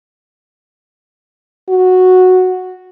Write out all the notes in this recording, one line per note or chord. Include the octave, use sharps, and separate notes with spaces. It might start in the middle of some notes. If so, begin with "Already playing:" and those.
F#4